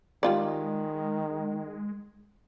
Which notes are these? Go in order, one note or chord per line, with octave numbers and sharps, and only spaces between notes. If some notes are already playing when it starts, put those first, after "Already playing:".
D#3 G3 G#3 F4 D5